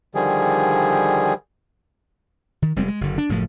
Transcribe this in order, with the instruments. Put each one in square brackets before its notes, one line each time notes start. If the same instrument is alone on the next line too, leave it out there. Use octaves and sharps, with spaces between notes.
[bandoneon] D3 D#3 F3 G3 G#4
[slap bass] D#3
F1 G3 G#3 C4
G#3
F#1 D3
D4
F#1 A2 F3